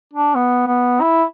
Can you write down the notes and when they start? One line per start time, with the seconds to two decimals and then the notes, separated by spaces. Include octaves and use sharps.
0.13 D4
0.35 B3
0.67 B3
1.01 E4